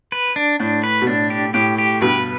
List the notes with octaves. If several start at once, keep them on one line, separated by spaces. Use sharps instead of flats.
B4
D4
A2 D4
B4
B2
A2 D4
G4
A2 G4
G4
G2 B2 B4